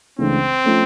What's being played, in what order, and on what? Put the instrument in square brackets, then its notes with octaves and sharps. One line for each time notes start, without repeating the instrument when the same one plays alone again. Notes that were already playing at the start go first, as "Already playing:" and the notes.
[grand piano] C#2 C#3 E3 A3 D4 [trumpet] C4
[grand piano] F3 A3 C#4